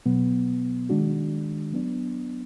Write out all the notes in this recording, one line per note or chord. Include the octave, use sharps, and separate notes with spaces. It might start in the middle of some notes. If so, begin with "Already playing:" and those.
B2 F#3 B3
D#3 G#3 D4 F#4
F#3 B3 D4